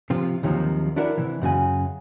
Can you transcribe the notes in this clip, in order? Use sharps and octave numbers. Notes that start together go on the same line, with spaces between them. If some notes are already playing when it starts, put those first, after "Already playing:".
C3 F3 F4
D#2 C3 D#3 F3 F#3
D4 E4 F#4 A#4 D5 E5
C3 E3
F#2 C#3 F#4 G#5